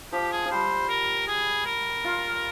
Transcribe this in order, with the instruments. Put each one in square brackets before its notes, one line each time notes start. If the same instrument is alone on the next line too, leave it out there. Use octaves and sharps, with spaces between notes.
[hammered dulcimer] F3 [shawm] G4
[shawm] G#4
[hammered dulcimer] F3
[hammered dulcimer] G3 [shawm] C5
[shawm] A#4
G#4
A#4
[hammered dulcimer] F4